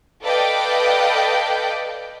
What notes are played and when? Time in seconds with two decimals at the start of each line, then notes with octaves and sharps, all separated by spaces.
0.23 A4 B4 D5 D#5 F5 G5